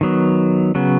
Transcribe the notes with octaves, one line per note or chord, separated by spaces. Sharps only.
D#3 F#3 B3
C#3 F#3 B3